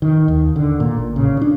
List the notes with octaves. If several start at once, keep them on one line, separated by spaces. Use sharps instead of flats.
D#3
D#2
D3
A#2
A1
C#3
D4